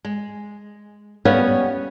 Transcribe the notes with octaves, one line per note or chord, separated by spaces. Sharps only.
G#3
G3 B3 C#4 C#5 F5 F#5